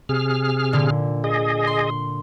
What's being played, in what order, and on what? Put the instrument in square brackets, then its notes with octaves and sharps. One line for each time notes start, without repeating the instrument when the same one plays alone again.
[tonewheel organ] C3 G#4 F6
[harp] A#2 D3
[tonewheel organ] G#4 D#5
[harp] C6